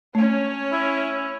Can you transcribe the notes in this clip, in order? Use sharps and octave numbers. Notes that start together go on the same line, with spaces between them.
A3 C#4 C#5
E4